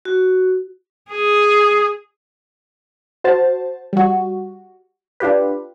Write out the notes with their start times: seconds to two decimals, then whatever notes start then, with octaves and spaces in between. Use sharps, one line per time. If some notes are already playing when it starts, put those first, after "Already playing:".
0.05 F#4
1.11 G#4
3.24 F#4 C5 A5
3.93 G3 F#4
5.20 D4 F4 G4 B4